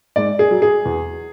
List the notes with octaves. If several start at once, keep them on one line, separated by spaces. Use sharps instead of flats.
G#2 D5
G#4
F#3
G#4
E2